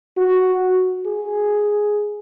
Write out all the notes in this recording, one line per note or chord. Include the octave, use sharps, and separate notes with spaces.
F#4
G#4